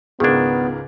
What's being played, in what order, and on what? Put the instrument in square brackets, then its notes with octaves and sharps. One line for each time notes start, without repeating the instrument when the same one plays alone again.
[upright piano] C#2 G#2 A#4 [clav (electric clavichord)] D#3 D4 [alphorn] B3 [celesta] G#4 G#6